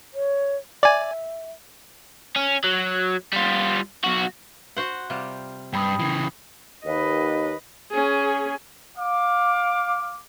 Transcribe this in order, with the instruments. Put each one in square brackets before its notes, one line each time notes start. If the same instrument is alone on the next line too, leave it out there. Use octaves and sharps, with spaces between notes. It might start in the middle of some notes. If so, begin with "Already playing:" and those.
[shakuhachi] C#5
[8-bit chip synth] D5 G#5 [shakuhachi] E5
[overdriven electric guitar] C#4
F#3
G3 F4
B1 F#4
[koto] F#4 C5 F#5
C3 G3 F4
[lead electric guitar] G2 [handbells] G5 B5 D#6
[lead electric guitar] C#3 E3
[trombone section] D#2 [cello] B4 D#5
[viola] C#4 G#4
[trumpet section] F5 D6